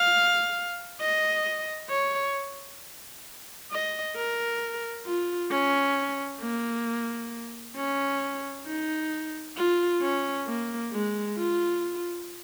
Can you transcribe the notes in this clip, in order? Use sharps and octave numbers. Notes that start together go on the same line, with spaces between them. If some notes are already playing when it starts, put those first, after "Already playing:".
Already playing: F5
D#5
C#5
D#5
A#4
F4
C#4
A#3
C#4
D#4
F4
C#4
A#3
G#3
F4